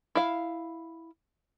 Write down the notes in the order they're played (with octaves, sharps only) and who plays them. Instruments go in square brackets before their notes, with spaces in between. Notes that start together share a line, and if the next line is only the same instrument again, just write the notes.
[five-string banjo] E4 F5